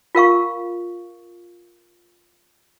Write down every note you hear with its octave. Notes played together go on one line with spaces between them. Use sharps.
F4 A#4 F5 C#6